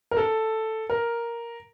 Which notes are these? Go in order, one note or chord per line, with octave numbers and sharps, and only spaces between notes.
A#4
A4
A#4